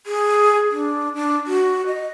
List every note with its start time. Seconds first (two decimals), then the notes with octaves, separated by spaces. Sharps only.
0.06 G#4
0.71 D4
1.15 D4
1.47 F#4
1.86 D#5